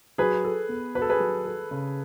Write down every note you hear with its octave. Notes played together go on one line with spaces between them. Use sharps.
F#3 G#4 B4
A4
B3
F#4 B4
A4
G#4 B4
F#3
A4
C#3